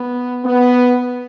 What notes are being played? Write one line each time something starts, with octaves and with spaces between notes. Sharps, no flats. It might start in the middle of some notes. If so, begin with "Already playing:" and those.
Already playing: B3
B3